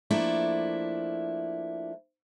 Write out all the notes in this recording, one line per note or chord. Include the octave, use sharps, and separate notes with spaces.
F3 A3 A#3 D4 E4